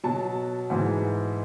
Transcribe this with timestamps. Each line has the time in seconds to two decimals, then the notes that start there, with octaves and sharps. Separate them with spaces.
0.04 B2 F#3 A5
0.70 G#2 E3 G#3